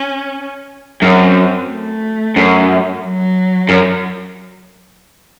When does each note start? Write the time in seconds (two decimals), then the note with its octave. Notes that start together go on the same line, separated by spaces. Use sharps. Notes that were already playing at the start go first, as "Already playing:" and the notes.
Already playing: C#4
1.02 F#2 C4
1.69 A3
2.36 F#2
3.03 F#3
3.69 F#2